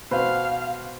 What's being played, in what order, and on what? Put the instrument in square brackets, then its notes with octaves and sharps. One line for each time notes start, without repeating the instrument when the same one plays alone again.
[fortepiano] B2 B4 C5 [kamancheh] F5